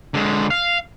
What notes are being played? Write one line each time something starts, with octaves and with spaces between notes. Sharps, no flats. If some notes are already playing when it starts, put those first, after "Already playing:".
D3 G#3
F5